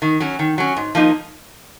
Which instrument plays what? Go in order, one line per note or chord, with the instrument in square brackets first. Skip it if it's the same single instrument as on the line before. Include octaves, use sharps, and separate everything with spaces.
[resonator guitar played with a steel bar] D#3
F#3 C#4
D#3
F#3 C#4
G#2
F3 A#3 D#4